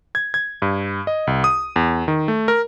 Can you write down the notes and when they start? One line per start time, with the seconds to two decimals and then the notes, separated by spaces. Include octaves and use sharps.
0.15 G#6
0.34 G#6
0.62 G2
1.07 D#5
1.27 C2
1.44 D#6
1.76 E2
2.08 D#3
2.28 A3
2.48 A#4